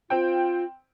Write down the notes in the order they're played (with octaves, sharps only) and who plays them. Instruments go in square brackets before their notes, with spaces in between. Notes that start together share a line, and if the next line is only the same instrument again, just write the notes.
[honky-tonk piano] C4 G5 [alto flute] F4